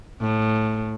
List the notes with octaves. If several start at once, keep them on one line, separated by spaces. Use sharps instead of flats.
A2